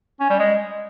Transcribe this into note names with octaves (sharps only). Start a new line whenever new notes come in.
C#4
G3
G#3